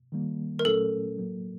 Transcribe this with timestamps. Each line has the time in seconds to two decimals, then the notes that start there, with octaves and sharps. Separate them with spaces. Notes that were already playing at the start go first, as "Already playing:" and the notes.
0.12 D#3 G3 A#3
0.59 A#4
0.65 A#2 F#3 A3 C#4 A4
1.18 A2 F#3 A#3